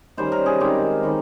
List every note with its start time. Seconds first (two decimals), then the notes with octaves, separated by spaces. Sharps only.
0.17 D#3 G3 C#4 C5
0.32 A#4
0.46 G#4
0.60 D#3 G#3 C4 G4
1.03 D#3 G3 C#4